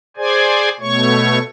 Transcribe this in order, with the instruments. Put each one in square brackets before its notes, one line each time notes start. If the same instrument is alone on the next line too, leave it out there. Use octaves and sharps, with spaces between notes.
[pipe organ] G#4 C5 D5 G#5
B2 A3 C#5 C#6